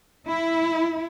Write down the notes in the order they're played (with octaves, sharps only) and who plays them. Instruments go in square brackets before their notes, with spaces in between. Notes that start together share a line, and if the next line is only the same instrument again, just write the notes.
[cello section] E4